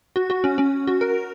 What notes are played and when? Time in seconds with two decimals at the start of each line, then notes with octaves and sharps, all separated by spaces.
0.16 F#4
0.30 F#4
0.44 C#4
0.58 C#4
0.87 F#4
1.01 A#4